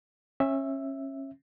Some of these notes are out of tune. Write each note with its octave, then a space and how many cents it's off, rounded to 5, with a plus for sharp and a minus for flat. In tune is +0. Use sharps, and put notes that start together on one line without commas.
C#4 -30 E5 +0